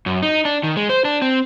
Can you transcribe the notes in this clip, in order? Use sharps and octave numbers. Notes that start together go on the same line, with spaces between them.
F#2
D#4
D4
D#3
G#3
C5
D4
C4